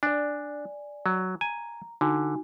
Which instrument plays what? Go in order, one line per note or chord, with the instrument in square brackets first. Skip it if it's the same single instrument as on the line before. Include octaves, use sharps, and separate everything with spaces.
[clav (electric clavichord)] D4 [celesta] D5 G#5
[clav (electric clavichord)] F#3
[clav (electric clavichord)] G#5 [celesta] A#5
[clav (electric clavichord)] D3 [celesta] D#4 F#4 G#5